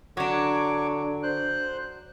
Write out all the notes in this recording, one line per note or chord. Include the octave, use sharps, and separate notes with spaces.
D3 F#3 D4 C#5 C#6 D6
C5 F#6